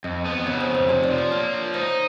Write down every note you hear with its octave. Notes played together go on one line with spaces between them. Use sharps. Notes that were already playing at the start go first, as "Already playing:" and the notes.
F2 D#5
B3
C#3 C#5
C5
F2
C5
C3 C#5
D5
F3
D5
A#3 C#5
F3
D#4 C5